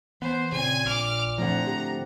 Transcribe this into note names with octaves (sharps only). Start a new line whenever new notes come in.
E3 B3 C5
A#2 C#3 C4 G#5
A#1 D6 F6
A2 D3 F3 C4 F#5 A#5
G4